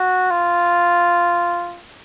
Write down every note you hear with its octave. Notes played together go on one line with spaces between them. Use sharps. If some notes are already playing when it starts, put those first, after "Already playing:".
Already playing: F#4
F4